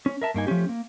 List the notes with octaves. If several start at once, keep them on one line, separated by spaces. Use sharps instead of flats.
C#4
A#4 E5 A5
G2 A#3 D#4 G#5
F3 A3 C#4 G4
A#3